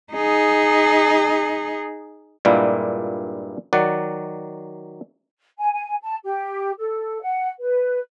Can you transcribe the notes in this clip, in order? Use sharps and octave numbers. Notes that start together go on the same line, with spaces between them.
D#4 G#4
G2 A#2 G3 G#3 A#3 E4
D#3 F#3 D5 F#5
G#5
G#5
A5
G4
A4
F#5
B4